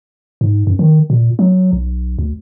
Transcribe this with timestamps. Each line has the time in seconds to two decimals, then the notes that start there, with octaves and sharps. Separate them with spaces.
0.41 G#2
0.67 F#2
0.79 D#3
1.10 A#2
1.39 F#3
1.73 B1
2.19 D2